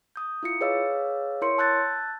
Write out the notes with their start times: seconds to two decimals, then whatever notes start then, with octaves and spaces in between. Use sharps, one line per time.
0.16 D#6 G6
0.43 E4 F4 C#7
0.61 G#4 B4 C#5 D#5 F5 E6
1.41 E4 A#4 C#5 C6 C#7
1.58 A5 E6 F#6 G6 A6